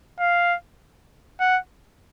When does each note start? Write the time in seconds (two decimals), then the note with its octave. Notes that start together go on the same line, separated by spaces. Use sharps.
0.20 F5
1.40 F#5